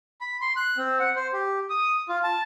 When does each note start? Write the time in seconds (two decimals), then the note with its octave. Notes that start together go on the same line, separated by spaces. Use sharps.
0.21 B5
0.41 C6
0.56 F#6
0.77 C4
0.99 F#5
1.16 C5
1.33 G4
1.70 D#6
2.09 F4
2.23 A5